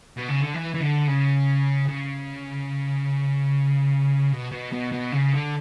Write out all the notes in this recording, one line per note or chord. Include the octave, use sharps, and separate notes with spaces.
B2
C#3
D3
E3
E3
D3
C#3
C#3
B2
B2
B2
B2
C#3
D3